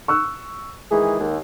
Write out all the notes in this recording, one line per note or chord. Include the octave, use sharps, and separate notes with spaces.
C#6 E6 F#6
D#3 E3 G#3 G#4
D#2